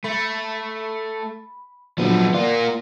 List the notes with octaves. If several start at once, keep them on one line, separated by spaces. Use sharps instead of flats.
A3 B5
A#2 D3 F3 F#3 B3
A#3 F4 D5 F#5